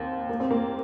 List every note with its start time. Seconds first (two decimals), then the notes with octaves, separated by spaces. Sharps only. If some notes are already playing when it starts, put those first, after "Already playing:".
Already playing: D#2 A#3 C4
0.29 A#3
0.40 C4
0.51 A#3